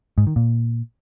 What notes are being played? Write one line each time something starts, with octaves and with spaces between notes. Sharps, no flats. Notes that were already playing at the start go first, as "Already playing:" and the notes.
G#2
D#3
A#2